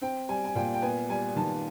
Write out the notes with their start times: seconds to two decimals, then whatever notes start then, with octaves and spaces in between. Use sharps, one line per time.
0.01 C4 G5
0.29 G3 G#5
0.45 G#5
0.55 A#2 G5
0.74 G5
0.82 B3 G#5
1.09 G3 G#5
1.36 D#3 A5